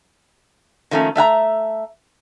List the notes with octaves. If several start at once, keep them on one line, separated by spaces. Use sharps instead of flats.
D#3 F3 A3 A#3 C#4
A3 E5 F5 A#5